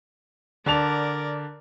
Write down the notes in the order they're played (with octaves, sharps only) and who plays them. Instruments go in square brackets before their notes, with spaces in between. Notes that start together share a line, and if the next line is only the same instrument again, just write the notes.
[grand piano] D3 A5 F7 [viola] A#4 D5